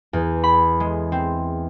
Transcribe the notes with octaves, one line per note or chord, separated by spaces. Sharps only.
E2
B5
G#3
C4